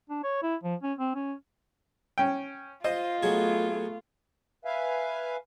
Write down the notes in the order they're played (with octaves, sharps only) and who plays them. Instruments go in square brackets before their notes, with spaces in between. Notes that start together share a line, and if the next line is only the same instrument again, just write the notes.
[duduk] D4
C#5
E4
F3
C#4
C4
C#4
[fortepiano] C#4 G5
[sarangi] F4 [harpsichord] C5 [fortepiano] D#5
[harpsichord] F#3 G#4 [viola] A3 B3
[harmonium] B4 E5 F5 G#5